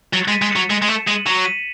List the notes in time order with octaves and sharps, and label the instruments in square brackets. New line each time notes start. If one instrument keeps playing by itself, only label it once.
[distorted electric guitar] F#3 [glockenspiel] A6 C#7
[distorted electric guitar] G#3
[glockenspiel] B6 D#7
[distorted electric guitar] G#3
[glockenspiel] C#7 E7
[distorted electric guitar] F#3
G#3
G#3
[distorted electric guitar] A3 [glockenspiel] C#7 E7
[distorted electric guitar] G#3 [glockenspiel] D#7 F#7
[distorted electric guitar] F#3 [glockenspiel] C#7 E7
[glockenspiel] B6 D#7